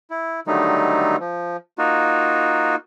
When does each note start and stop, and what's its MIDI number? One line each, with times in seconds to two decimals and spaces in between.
0.10 0.40 64
0.47 1.16 50
0.47 1.16 51
0.47 1.16 54
0.47 1.16 55
0.47 1.16 57
0.47 1.16 63
1.20 1.57 53
1.78 2.76 58
1.78 2.76 63
1.78 2.76 65
1.78 2.76 66